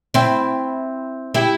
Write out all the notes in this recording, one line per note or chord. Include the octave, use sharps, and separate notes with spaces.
C4 E4
E4 G4